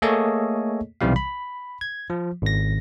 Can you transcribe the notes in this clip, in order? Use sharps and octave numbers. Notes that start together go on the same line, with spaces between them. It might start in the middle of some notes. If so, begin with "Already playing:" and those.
A3 A#3 G#4 A4 C#5 D#5
B1 C3 E3 G3 F5
B5
G#6
F3
G#1 A#6